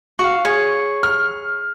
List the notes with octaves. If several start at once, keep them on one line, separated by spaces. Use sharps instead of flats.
F#4 F5 C#6
G#4 C#5
F6